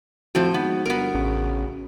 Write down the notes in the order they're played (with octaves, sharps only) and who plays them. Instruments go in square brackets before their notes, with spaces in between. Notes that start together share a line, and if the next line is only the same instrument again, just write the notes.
[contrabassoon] F2 [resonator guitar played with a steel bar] A2 F3 C5 [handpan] F#4
[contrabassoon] G#2 [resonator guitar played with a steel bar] B3
[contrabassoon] G1 [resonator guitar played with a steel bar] B3 A#4
[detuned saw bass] A1 [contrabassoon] C#3